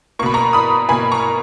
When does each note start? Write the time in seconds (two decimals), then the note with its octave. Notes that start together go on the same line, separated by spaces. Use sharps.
0.19 A#3 C#6
0.23 B2 B5
0.34 A#5 C#6
0.53 B5 D#6
0.89 B2 A#3 G#5 B5
1.12 A#5 C#6